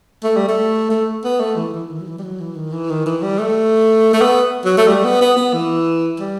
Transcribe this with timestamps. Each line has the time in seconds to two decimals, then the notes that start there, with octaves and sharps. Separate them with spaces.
0.24 A3
0.36 G3
0.48 A3
0.90 A3
1.24 B3
1.40 A3
1.56 E3
1.74 E3
1.89 D#3
2.00 F#3
2.07 E3
2.18 G3
2.23 F#3
2.40 E3
2.55 D#3
2.72 E3
2.90 D#3
3.06 E3
3.22 G3
3.39 A3
4.13 A3
4.21 B3
4.65 F#3
4.78 A3
4.88 G3
5.04 B3
5.21 B3
5.37 B3
5.53 E3
6.20 G3